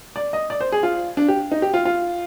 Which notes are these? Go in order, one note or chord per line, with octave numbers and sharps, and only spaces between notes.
D5
D#5
D5
C5
G#4
F4
D4
G4
D#4
G4
F4
F4